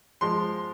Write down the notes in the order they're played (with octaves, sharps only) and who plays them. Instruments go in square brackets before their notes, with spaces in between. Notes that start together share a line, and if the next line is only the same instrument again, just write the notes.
[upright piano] F3 G#3 C6